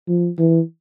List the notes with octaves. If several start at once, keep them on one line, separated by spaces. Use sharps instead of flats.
F3
E3